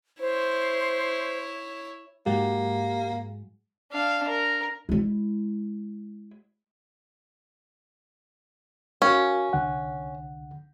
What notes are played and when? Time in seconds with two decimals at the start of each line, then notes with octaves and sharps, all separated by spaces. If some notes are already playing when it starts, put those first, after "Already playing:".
0.20 E4 C5 C#5
2.26 G#2 F#3 G#3 A#3 G4 F#5
3.92 D4 F5
4.28 A#4
4.89 G#3 E4
9.02 C#4 F#4 A#4 F5
9.53 C2 D3 F#5